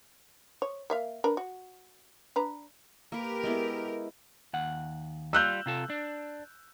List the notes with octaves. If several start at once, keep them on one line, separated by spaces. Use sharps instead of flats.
C#5
A#3 E5 F5
D4 A#4 B4
F#4
D4 B4 A#5
A#3 G4 A#4 B4
G#3 B3 E4
D#2 F#5
G3 F4 E6 F#6 G6
C3 F4 A4
D4